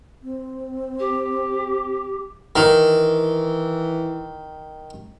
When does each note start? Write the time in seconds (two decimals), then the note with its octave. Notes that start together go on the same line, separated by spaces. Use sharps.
0.23 C4
0.99 G4
2.56 D#3 E3